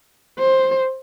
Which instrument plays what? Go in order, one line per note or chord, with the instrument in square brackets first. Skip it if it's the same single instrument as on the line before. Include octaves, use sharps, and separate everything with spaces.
[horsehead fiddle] C5